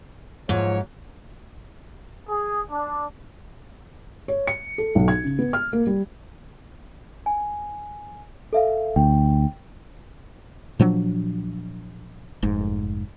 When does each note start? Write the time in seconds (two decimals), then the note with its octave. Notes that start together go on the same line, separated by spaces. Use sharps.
0.49 G#2 F3 F#3 C#5
2.28 G#4
2.70 D4
4.28 C#5
4.47 C#7
4.78 A4
4.95 B1
5.08 G#6
5.24 C#3
5.39 B3
5.53 F6
5.73 A#3
5.87 G3
7.26 G#5
8.53 A4 E5 F5
8.96 D2 G5
10.79 A#2 F3 F#3 D4
12.43 F1 G#2